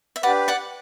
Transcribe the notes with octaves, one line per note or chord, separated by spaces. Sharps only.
E5
D4 G4 B4 D5 F#5
D5 F#5